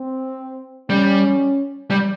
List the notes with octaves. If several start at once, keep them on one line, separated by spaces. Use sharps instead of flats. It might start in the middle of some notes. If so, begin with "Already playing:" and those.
Already playing: C4
G3 C#4
G3